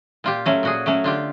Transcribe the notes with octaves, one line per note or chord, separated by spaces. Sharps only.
A#2 F4 G4
F#3 A3 C#4
A#2 F#4 G#4
F#3 A3 C#4
D3 F4 G4